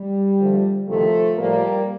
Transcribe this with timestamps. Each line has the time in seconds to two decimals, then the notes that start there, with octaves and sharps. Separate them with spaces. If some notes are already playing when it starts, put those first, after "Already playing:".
Already playing: G3
0.38 D2 D3 F3
0.87 D2 C3 D#3 F3 A3
1.37 A2 F3 G3 A#3